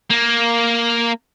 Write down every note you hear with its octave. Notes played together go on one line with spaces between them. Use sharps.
A#3